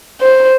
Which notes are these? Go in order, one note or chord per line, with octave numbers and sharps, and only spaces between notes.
C5